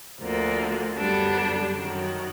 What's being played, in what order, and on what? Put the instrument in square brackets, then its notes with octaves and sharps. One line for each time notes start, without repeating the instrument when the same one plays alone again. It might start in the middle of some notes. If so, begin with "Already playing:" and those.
[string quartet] D2 D3 F3 A#3
F#2 D3 G3 B3 D4
F#2 D#3 F#3